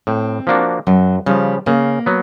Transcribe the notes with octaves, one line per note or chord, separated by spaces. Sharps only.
A2 C4
F3 A#3 D4 F#4
F#2 F#3
C#3 F3 G3
C#3 A#3
F#3 B3